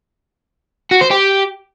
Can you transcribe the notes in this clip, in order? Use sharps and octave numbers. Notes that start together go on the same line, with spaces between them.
F#4
C5
G4